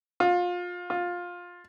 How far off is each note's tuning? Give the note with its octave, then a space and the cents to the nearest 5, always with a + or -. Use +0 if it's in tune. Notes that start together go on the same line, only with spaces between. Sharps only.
F4 +25
F4 +15